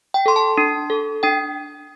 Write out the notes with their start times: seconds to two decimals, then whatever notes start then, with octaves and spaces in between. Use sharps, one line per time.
0.14 G5
0.26 A4 C6
0.36 A5
0.58 D4
0.90 A4
1.23 D4 G5